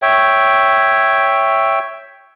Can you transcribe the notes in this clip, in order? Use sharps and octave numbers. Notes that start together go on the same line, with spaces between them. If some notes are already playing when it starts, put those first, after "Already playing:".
C#5 E5 G5